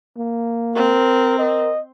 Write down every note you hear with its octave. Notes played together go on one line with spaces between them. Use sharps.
A#3
C4 A#4
A#4 D#5